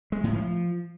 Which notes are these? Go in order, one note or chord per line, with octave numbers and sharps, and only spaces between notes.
G#3
A2
F3